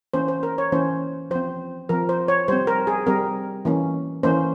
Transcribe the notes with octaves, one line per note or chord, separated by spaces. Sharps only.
E3 A#3 C#4 C5
C5
A#4
C#5
E3 A#3 C#4 C5
F3 C4 C5
F3 C4 A#4
C5
C#5
G3 C4 C5
A#4
G#4
G3 C4 A#4
E3 A#3 C#4
E3 A#3 C#4 C5